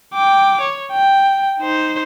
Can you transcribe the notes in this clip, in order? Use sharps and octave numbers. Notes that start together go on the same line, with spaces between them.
G5 D6
C#5
G5
D#4 C5